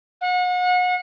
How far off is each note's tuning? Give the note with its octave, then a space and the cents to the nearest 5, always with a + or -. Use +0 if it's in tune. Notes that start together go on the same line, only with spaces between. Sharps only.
F#5 -35